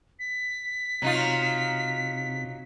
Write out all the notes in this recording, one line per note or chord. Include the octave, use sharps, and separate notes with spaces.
B6
C3 F#3 D#4 F4